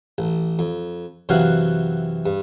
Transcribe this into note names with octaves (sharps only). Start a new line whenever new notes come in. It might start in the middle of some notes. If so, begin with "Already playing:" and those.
A1
F2
F#2 C3 E3 F#3 F5 F#5
G2